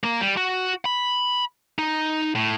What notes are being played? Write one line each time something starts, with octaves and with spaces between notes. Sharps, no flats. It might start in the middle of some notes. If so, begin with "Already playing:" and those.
A#3 A#4
G3
F#4
B5
D#4
A2